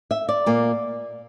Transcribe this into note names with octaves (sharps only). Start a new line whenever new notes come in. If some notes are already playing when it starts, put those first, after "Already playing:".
E5
D5
A#2 A#3